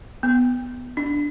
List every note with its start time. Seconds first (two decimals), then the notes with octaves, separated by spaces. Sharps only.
0.23 B3
0.97 D4